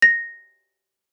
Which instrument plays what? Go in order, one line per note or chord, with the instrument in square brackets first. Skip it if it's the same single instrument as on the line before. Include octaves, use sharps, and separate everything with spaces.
[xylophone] A#6